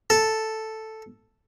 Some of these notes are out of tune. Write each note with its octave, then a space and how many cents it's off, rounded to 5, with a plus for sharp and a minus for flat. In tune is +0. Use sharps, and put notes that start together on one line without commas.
A4 +0